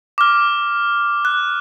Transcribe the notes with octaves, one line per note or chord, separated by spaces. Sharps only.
D6 F6
F#6